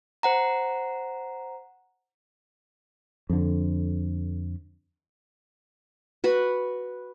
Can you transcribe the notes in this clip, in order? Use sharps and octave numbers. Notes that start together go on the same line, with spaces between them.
C5 F#5 A#5
F2 D3
F#4 B4